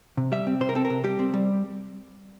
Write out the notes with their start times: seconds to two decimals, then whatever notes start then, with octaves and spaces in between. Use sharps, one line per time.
0.17 C3
0.32 G3 E5
0.47 C4
0.61 C3 C5
0.69 A#4
0.75 C4 A4
0.85 A#4
0.90 C3
1.04 G3 G4
1.19 C4
1.34 G3